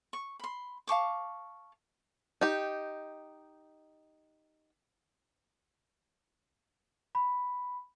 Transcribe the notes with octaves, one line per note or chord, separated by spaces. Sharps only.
C#6
B5 C6
F5 A5 C#6 D6
D#4 G4
B5